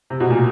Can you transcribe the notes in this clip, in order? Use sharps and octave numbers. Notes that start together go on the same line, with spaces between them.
C3
B2
A#2